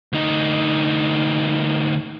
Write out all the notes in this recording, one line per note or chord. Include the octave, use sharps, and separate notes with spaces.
D2 D#4